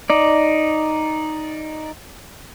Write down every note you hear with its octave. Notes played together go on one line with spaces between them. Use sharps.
D#4 D5